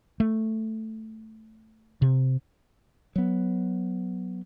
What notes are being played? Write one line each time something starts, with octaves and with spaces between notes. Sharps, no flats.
A3
C3
F#3 B3